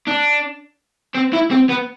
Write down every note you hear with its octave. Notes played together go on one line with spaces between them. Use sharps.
D4
C4
E4
C4
B3